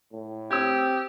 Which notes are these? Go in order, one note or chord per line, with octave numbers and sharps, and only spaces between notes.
A2
C4 G4 D#6 E6 G#6